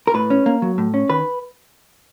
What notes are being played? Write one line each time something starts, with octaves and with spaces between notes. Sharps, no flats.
A#4
A2 B4
C#4
A#3
F#3
A2
C#4
D#3 B4